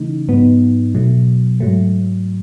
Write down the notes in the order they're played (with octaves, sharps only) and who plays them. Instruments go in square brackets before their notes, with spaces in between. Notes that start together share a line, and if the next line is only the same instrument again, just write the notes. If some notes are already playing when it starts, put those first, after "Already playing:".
Already playing: [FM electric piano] C#3 E3 A3 D#4
G#2 F#3 B3 D#4
B2 F#3 A3
G#2 F#3 A3